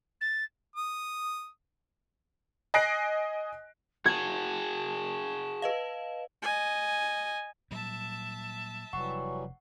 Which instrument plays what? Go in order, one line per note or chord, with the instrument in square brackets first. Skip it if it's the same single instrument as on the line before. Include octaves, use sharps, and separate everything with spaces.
[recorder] A6
[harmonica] D#6
[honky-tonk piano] D#5 G#5 F#6 A#6 C7 D7
[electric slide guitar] F#4 G#4 [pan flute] A5 [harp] G#6
[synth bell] B4 D#5 F5
[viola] D#5 G#5
[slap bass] A#2 F#3 G3 [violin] E5 A5
[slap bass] F1 [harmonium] E3 F#3 G3 [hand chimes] F#5 C#6